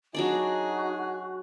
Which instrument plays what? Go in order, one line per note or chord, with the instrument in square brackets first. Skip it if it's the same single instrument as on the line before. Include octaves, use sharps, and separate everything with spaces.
[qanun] F#3 D4 D5 [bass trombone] D#4 [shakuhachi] F#4 [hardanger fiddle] G#4